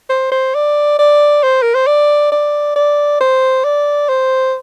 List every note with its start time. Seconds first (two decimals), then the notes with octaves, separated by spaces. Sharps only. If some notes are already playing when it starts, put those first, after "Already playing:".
0.10 C5
0.32 C5
0.55 D5
0.99 D5
1.43 C5
1.62 A#4
1.75 C5
1.87 D5
2.32 D5
2.76 D5
3.21 C5
3.64 D5
4.09 C5